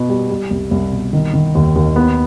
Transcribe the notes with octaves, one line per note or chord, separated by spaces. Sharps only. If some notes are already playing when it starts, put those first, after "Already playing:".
Already playing: B2 B3
G3
G3
C2
C2
B2
D#3
D#3
D#2
D#2
B3